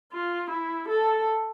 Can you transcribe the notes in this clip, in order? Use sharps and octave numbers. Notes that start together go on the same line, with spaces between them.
F4
E4
A4